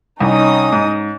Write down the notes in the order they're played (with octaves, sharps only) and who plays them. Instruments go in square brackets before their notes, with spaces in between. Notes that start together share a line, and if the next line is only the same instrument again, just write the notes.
[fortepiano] C2 [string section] C#4 D#4 D#6
[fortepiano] G#2